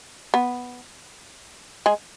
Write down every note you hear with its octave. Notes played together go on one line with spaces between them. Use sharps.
B3
G#3 G#4